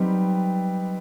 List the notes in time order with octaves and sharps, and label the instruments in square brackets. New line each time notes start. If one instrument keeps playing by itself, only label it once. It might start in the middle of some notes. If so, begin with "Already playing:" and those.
Already playing: [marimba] F#3 [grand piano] G3 C4 D#4 G4 B4